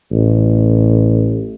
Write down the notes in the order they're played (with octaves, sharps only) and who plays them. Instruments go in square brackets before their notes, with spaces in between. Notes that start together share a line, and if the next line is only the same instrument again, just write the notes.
[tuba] A1